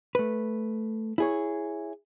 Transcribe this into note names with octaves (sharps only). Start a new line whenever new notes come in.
A3 B4
E4 G#4 C#5